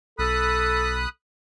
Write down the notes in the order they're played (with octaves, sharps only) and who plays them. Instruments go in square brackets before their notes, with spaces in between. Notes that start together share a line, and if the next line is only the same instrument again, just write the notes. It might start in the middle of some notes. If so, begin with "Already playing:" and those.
[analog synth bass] B1 [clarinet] A4 [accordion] B5 D#6 F#6